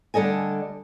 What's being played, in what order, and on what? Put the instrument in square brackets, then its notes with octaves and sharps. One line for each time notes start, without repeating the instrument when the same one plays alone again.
[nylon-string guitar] D3 G3 A4 D#5 G#5